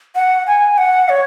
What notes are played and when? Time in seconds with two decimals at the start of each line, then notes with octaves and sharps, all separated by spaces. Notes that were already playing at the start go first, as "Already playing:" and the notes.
0.15 F#5
0.47 G#5
0.78 F#5
1.09 C#5